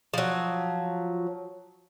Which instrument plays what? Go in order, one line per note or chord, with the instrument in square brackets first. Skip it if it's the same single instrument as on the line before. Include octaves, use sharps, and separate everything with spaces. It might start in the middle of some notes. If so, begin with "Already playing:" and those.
[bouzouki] F3 F#3